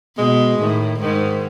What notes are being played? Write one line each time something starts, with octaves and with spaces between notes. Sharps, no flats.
B2 G#3
A2 D#3
G#2 D#3